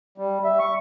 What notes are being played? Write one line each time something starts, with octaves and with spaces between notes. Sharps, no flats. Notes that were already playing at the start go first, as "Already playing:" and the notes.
G3
E5
C#6